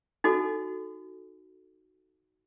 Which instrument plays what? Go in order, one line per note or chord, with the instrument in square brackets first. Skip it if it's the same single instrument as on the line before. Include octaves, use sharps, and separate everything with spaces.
[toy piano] D#4 F#4 A4